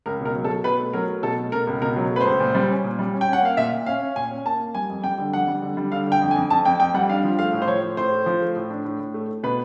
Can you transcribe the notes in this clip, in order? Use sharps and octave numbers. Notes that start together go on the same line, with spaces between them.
C#2 A#4
B2 A#4
F#3
A4
F#3
B2 B4
A3
F#3 A#4
A3
B2 A4
A3
B2 A#4
C#2
B2 A#4
F#3
A3 B4
C#2 C5
A#2
G3
C#4
A#2
G3
C#4
G5
C#4 F#5
A#3 F5
A#2 E5
A#2
C#4 F5
C#4
A#2 G#5
C#4
A#3 A5
A#3
G3 G#5
F2
G3 G5
D3
F2 F#5
G3
D3
G3
D3 F5
D3 G5
F2
G#5
F2
F2 A5
F2 G5
F2 G5
G3 F#5
D4 F5
F3
A3 F5
A2
C5
F3 C#5
A2
A2 C5
A3
F3
A3
A2
D4
A2
A2
A3
A3
B2 B4